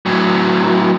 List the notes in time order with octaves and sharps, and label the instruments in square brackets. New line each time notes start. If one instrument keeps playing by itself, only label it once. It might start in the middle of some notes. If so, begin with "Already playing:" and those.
[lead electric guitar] A2 F#3